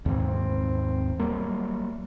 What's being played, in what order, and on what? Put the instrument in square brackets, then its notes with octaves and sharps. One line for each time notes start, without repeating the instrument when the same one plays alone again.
[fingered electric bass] D#2 G#2 E3 [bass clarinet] C4
[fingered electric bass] F#3 G3 A#3